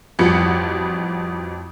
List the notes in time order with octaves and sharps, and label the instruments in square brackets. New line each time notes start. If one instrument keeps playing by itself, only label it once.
[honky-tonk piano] A1 F2 F3 G3 F#4 C#7